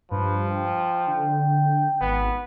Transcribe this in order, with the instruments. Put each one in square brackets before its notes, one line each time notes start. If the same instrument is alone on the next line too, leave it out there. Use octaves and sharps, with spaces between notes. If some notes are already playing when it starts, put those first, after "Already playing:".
[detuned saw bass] G2 [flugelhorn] F3 [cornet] B4
[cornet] G5
[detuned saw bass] D3
[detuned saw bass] G#1 [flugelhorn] B3